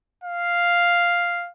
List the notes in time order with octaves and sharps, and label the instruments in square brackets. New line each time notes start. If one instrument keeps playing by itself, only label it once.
[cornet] F5